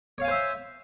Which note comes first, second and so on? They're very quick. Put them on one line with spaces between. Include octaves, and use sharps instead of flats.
C#5 F5 G#5 C5 E5